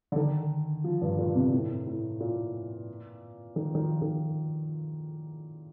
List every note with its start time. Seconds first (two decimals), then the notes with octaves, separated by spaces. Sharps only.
0.12 D3
0.16 D#3
0.84 F3
1.01 G2
1.18 A#2
1.35 C3
1.52 A2
1.86 A2
2.20 A#2
3.56 D#3
3.75 D#3
3.79 F3
4.02 D#3